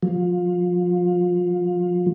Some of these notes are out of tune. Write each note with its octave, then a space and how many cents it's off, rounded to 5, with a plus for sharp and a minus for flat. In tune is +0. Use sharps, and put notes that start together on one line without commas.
F3 +25